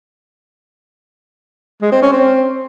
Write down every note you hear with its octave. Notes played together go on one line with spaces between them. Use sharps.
G#3
C4
C#4
C4